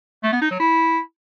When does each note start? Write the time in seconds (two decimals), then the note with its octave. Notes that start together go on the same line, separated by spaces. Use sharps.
0.24 A3
0.33 B3
0.42 D#4
0.51 F#3
0.60 E4